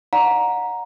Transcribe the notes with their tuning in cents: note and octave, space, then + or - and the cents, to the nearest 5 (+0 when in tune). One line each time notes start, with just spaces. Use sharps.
D5 +0 F#5 -30 A#5 +5